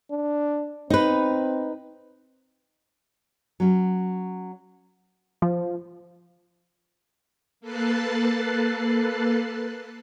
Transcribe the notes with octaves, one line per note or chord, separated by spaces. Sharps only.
D4
C4 D#4 B4
F#3 C#4
F3
A#3 A4 B4 F#6 A6 C7